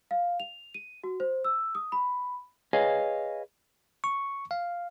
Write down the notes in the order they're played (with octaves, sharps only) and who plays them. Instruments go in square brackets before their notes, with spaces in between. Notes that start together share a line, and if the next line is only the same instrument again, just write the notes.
[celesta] F5
F7
D#7
F#4
C5
E6
D#6
B5
[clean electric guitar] G#4 B4 C#5 D#5 F5 G#5
[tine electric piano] C#6
F5